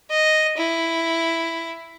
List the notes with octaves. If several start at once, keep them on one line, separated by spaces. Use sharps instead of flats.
D#5
E4